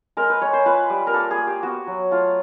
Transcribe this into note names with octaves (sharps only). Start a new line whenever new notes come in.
G#3 A#4
B4
G#3 C#5
C5
F4 B4
G3
A#4
A#3 A4
G#4
A#3
G4
B3 F#4
F#3
A3 F4